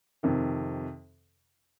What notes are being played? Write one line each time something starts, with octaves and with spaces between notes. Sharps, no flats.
F2 C3 D#3